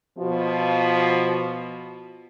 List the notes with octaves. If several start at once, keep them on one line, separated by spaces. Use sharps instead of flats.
B2 F3